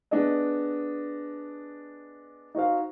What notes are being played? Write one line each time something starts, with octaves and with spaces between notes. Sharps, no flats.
B3 D4 G#4 D5 D#5
D#4 F#4 C5 F5